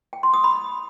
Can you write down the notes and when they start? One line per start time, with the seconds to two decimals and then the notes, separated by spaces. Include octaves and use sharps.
0.13 G5
0.23 C6
0.34 D#6
0.44 B5